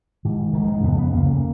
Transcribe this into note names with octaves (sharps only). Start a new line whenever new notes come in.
G#2 D#3
G#2 D#3
F3
G#3
F2 C#3 B3
B3
F2 C#3 A#3